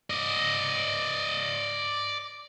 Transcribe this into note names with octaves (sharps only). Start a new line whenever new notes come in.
D5 D#5